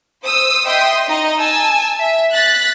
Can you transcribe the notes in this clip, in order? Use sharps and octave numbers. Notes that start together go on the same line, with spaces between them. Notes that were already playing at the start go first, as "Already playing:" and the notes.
C5 D#6 E6
D#5 E5 G5 C6 D#6
D#4 D#5
G#5 A5 E6
E5
F#6 A6 B6